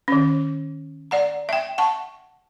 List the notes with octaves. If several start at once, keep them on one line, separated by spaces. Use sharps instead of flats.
D#3 C#4
D5 F#5 A#5
E5 G5
F#5 A5 C#6